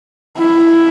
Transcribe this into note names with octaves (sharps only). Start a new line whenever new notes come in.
E4